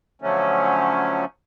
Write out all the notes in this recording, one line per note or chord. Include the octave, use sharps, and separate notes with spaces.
D3 F3 F#3 A3 C#4